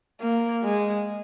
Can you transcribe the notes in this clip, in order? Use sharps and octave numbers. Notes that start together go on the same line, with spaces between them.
A#3
G#3